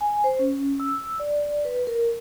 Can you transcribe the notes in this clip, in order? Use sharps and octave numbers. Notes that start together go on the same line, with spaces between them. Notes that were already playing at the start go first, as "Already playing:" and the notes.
G#5
C5
C#4
E6
D5
B4
A#4